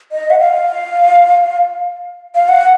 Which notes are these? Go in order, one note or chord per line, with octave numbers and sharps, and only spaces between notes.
D#5
F#5
F5
F5
F#5